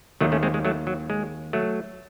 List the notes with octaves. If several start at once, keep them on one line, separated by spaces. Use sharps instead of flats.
D#2 D#3 F#3 A3
A3 C#4
G#3 C4
G#3
F#3 A3
F#3
G#3
F#3 A3